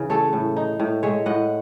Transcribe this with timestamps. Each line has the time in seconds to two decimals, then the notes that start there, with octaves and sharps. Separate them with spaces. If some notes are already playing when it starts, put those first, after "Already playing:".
Already playing: C#3 E3
0.10 A3 A4 C#5
0.33 A2
0.57 D#4
0.80 A2
1.03 G#3 C#5 E5
1.26 A2 D#5 F#5